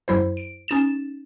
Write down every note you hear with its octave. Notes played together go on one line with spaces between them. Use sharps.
F#2 F#3 E4 C5
D7
C#4 D#4 A6 E7